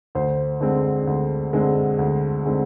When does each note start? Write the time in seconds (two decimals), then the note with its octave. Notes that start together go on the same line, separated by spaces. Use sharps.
0.15 D2 C5
0.60 D3 G#3 C4
1.07 D2
1.53 D3 G#3 C4
1.99 D2
2.45 D3 G#3 C4